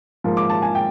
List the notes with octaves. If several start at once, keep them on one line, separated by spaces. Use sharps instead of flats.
G#2 F3 A#3
D6
A5
G#5
G5